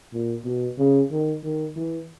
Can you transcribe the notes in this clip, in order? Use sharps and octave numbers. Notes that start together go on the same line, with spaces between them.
A#2
B2
C#3
D#3
D#3
E3